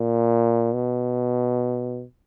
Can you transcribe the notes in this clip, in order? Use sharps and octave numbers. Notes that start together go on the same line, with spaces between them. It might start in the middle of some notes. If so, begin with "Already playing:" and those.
Already playing: A#2
B2